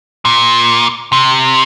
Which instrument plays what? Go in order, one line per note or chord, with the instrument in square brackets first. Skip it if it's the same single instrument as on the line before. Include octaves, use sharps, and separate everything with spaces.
[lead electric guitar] A#2
C3